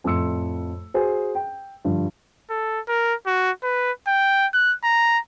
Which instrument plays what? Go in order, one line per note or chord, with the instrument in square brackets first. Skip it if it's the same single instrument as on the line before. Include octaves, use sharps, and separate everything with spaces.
[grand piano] F2 A2 A3 C6 E6 C#7
F#4 G#4 C5
G5
G2 D3 F3
[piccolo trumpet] A4
A#4
F#4
B4
G5
F#6
A#5